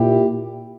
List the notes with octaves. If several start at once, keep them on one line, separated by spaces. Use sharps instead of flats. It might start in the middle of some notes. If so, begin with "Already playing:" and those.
Already playing: A#2 E4 G4